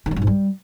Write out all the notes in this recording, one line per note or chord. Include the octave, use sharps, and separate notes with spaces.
D#3
G#3
G2
G#2
G3